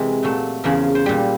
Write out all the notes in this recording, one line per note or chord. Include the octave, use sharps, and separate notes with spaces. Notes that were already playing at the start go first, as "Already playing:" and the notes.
Already playing: C3 E3 G#3 A#4
A#2 F#3 A3
E2 C#3 F3 A#4
C5
A#2 G3